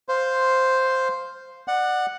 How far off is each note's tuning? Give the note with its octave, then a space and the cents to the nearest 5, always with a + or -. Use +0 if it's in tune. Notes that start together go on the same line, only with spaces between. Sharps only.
C5 +0 F5 +0
D5 +30 F#5 +0